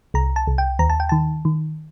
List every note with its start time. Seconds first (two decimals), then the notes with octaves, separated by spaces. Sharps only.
0.14 C2 A#5
0.36 A5
0.47 C2
0.58 G5
0.79 D#2 A#5
0.90 A5
1.00 G5
1.09 D#3 A5
1.45 D#3